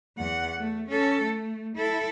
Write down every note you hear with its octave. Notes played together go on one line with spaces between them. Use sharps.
E2 F#5
A3
C#4 A4
A3
E4 A4